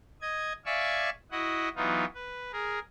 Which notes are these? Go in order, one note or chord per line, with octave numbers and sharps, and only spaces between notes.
D#5 G#6
D5 E5 F5 G#5 C#6 E6
E4 F#4 D#5 F#5
E3 F#3 B3 D#4 F4
B4
G#4 A#4